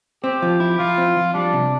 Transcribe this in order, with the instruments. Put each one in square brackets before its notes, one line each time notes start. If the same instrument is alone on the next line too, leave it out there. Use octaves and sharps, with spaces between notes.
[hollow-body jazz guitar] C4 [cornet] G4
[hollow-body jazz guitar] F3
E4
[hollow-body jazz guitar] F3 [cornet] F4
[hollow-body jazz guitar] C4
F3
[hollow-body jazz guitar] G3 [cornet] D4
[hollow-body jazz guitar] C3